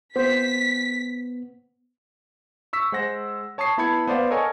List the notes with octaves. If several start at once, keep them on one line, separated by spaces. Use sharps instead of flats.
B3 C5 B6
C#6 E6 B6
G#3 C5 F#5 A#6
C#5 A5 C#6 D#6 C7
B3 E4 A5 B5 G#6 C#7
B3 C5 D5 F5 F#5
A4 A#4 C#5 D#5 G#5